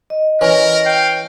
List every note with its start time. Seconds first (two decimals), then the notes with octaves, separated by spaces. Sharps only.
0.10 D#5
0.41 E3 C#4 A#4
0.86 F5 G5